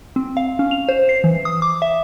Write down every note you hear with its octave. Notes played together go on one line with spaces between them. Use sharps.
C4
F5
C#4
F7
C5
C7
E3
D#6
D6
E5